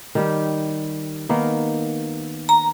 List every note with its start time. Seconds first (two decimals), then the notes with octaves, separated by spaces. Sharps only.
0.15 D#3 G3 G4
1.29 D#3 A#3 B3
2.49 A#5